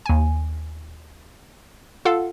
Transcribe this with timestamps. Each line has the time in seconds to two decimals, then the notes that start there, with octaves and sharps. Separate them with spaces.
0.06 D#2 G#5
2.05 F4 A4 F5 F#5